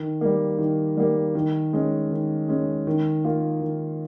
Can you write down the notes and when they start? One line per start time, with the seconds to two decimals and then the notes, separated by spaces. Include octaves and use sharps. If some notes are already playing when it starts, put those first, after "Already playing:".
Already playing: D#3
0.21 G3 A#3
0.59 D#3
0.97 G3 A#3
1.35 D#3
1.73 G#3 C#4
2.11 D#3
2.48 G#3 C#4
2.87 D#3
3.24 A#3 F4
3.62 D#3